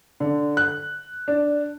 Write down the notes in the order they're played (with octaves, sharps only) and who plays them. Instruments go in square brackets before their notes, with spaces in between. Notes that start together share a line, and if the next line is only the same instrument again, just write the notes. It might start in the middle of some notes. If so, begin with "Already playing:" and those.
[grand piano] D3
F#6
D4